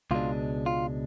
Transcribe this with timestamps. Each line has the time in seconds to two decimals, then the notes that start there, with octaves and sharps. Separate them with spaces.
0.11 C#2 B2 G#3 D4 F4
0.66 F4